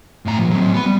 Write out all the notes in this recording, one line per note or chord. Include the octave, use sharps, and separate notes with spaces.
A2 A#5
A#2 F3
F#3 C4
B3 B5
G3